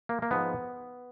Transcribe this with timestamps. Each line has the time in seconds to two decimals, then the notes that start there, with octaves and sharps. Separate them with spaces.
0.09 A#3
0.22 A#3
0.31 G#2 F3 G#3 B3